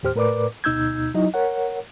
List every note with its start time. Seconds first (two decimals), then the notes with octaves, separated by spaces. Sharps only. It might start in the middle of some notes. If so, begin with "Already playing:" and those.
0.03 D#2 A2 G4 C5 F6
0.15 A2 A#4 B4 D5 D6
0.64 D2 B2 D#4 E6 G6 G#6
1.14 F#3 D#4 E4 D#5
1.34 A#4 C#5 F#5